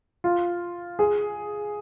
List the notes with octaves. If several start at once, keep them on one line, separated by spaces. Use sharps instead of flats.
F4
G#4